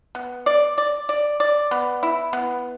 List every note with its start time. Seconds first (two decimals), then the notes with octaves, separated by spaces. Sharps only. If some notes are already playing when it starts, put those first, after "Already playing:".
0.15 B3
0.46 D5
0.78 D5
1.09 D5
1.40 D5
1.71 B3
2.03 E4
2.33 B3